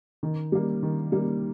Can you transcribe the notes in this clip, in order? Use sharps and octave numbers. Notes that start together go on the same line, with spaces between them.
D#3
G3 A#3
D#3
G3 A#3